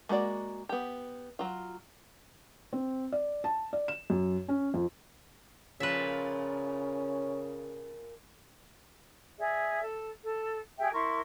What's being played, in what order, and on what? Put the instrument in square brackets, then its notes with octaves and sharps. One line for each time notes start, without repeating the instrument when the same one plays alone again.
[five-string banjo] G#3 A#3 F#4 D5
B3 G4
F#3 F4
[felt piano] C4
D5
A5
D5
E7
F#2
C#4
F2
[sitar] A#2 F3 [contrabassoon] C#3 [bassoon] C#4 [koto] B4 E5
[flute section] G#4 D5 E5
A4
A4
G4 G#4 E5 G5
E4 A#4 C6 C#6